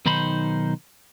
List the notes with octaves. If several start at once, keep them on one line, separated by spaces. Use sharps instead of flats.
B1 D#3 D#4 C5 B5